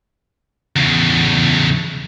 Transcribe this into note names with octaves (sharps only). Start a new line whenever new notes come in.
E2 C#3